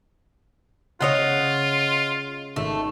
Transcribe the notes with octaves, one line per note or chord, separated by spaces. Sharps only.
C#3 G#3 F4 C#5 D#5 F#5
G#1 A3